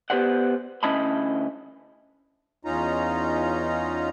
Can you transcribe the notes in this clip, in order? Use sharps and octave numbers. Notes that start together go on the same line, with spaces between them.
B3 G4 B4 C5 D5 F#5
D2 C#4 E4 D#5 A5 B5
E2 C#4 D#4 F4 A#5